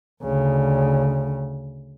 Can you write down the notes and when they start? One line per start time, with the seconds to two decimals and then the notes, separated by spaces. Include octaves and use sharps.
0.24 D2 C#3